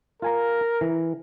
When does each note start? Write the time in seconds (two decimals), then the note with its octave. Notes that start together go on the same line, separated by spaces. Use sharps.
0.22 F4 A#4 G#5 A#5
0.81 E3